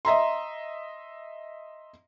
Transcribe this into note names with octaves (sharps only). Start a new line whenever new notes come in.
D#5 E5 A#5 C6